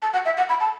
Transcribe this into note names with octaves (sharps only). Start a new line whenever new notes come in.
A5
F#5
E5
F#5
B5
A5